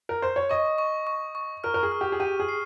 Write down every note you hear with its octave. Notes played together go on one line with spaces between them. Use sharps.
A#4
C5
C#5
D#5 C#6
C#6
C#6
C#6
A#4 F6
A#4
G#4
F6
G4
G#4
G4 D#7
G#4
C7